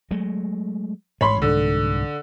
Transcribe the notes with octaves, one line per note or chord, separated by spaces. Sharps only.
F#3 G#3 A3
A1 G#2 G#3 C#5 B5 C6
C2 G#2 D3